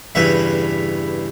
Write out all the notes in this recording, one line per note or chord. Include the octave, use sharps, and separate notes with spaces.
E2 G2 C#3 B4 E5